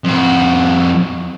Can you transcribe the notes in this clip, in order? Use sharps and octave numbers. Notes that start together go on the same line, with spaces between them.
F2 F#4